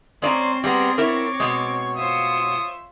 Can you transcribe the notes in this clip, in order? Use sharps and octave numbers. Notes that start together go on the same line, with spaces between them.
G#3 C4 C#4 C5 D5 A#5
G3 B3 G#4 A#5 C6
E4 A#4 C#5 D6
B2 G#3
F4 C5 C#5 E5 D#6